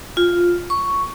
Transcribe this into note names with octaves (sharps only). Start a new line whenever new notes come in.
F4
C#6